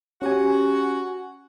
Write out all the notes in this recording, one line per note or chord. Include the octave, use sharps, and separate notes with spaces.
C#4 F#4 G4 G#5